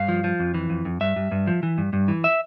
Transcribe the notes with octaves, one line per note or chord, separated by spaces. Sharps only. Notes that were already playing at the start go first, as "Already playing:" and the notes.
Already playing: G2 F5
F3
F3
F2
E3
F2
F2
G2 E5
G2
G2
F3
E3
G2
G2
E3
E5